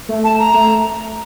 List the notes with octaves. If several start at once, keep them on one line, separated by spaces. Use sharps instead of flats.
A3
A5
A#5
A3